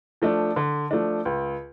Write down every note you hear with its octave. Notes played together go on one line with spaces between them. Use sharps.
F3 A3 D4
D3
F3 A3 D4
C#2